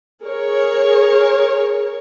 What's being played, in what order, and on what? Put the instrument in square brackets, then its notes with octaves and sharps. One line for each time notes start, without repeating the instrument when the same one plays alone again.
[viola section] G#4 A#4 C#5